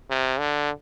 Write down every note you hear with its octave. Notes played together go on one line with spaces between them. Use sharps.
C3
D3